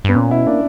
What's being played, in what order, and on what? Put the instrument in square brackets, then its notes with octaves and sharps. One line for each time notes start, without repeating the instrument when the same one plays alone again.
[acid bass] G2 [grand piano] B3
[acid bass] A#2 [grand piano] C#4
[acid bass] B2 [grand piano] E4
[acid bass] A#3 [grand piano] D4